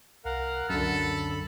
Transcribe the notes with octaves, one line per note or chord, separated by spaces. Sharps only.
C2 A#4 F5 F#5
C#2 F#2 D3 A4 B5